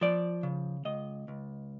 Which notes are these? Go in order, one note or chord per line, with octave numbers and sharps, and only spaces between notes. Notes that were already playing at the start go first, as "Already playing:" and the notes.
F3 D5
C#3
C#2 D#5
C#2